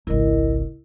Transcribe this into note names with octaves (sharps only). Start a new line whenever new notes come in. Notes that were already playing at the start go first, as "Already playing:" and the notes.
G#1 C#2 E4 A#4 D#5